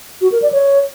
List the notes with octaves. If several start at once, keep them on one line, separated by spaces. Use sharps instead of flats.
F#4
A#4
D5
C#5